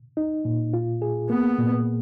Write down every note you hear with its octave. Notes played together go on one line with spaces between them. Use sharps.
D#4
A#2
F4
G#4
A#3 B3
A#2